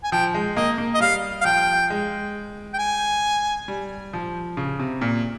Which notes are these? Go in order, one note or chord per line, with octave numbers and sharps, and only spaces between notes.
G#5
F3 G5
G#3
A#3 D#5
A#3
D#5
G3 F5
F5
F3 G5
G#3
G5
G#5
G3
F3
C#3
C3
A#2